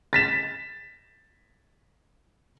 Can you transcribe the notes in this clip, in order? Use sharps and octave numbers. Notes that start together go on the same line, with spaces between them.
A6 B6 E7